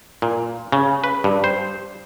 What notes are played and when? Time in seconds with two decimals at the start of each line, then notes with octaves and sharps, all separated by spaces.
0.22 A#2
0.72 C#3
1.04 B4
1.24 G2
1.44 C5